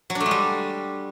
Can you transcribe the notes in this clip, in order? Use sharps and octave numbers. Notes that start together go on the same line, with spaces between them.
F#3
D4
A3
G#3
G3